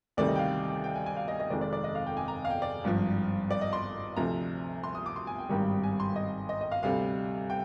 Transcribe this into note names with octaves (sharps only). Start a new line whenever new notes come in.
D2 C3 D#3 G3 D5
D#5
G5
F5
G5
G#5
G#5
F5
D#5
D#5
F1 F2 D#3 G#3 D5
D5
D5
D#5
F5
G5
G#5
A#5
F5
G5
D5
G#1 G2 F3
D5
D#5
C6
D2 C3 F3 A#5
C6
D#6
D6
C6
G#5
G5
G#1 G2 D#3 G3
G#5
C6
D#5
D#5
D#5
F5
D2 C3 G3 F5
G5